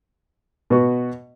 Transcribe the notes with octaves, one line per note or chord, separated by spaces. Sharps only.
B2 B3 F#4